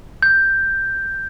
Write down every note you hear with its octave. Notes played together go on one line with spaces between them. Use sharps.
G6